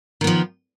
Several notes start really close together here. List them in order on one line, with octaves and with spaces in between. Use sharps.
D#3 B3 F3